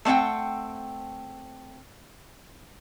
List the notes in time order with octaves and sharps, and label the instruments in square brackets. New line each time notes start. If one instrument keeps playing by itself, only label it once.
[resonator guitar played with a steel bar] A3 C4 C#5 F#5 G5